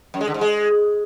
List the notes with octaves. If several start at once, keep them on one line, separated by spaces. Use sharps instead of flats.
F#2
G#3
D3
G#2
G#3